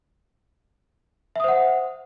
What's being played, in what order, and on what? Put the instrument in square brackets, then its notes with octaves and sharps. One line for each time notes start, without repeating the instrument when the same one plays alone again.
[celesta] E5
D#6
C5
F#5